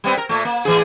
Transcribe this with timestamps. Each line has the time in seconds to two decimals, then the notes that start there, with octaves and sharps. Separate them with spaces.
0.04 G3 B3 C4
0.17 A#4
0.29 A#2 A3
0.45 A#3
0.65 A2 E3 G#4